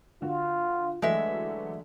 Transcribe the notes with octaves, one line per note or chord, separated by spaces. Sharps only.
D3 F4 F#4
D3 E3 F#3 G#3 A3 E5